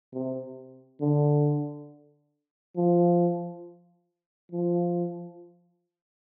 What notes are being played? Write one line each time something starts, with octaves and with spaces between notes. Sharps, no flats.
C3
D3
F3
F3